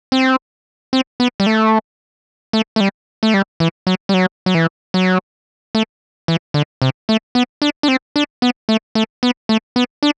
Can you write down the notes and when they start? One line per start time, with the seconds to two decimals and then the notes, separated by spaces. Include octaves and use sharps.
0.12 C4
0.93 C4
1.20 B3
1.40 G3
1.46 A3
2.53 A3
2.76 A3
2.80 G3
3.23 A3
3.34 G3
3.60 E3
3.87 F#3
4.09 G3
4.14 F#3
4.46 F#3
4.55 E3
4.94 F#3
5.75 A3
6.28 E3
6.54 D3
6.82 C3
7.09 A3
7.35 B3
7.62 D4
7.83 D4
7.88 C4
8.16 D4
8.42 B3
8.69 A3
8.95 A3
9.23 B3
9.49 A3
9.76 B3
10.03 D4